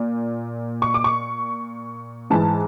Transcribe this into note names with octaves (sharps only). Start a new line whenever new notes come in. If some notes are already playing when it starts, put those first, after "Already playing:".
Already playing: A#2
C#6
D6
C#6
G#2 E3 G#3 A5